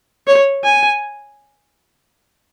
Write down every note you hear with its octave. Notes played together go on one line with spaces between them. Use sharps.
C#5
G#5